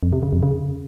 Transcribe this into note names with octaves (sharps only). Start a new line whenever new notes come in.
F2
C3
C#3
F2
C#3